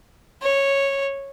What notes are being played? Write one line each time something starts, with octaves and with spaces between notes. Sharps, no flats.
C#5